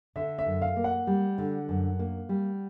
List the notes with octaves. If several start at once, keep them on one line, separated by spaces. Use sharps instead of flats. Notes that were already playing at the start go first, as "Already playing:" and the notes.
D3 E5
E5
F#2
F5
A#3
F#5
G3
D3
F#2
A#3
G3